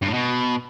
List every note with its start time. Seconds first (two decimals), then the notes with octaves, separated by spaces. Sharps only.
0.02 G2
0.08 A2
0.14 B2